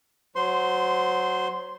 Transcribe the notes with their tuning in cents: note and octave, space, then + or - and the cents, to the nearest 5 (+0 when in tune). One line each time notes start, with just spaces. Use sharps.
F#3 +0 C5 -20 C6 +0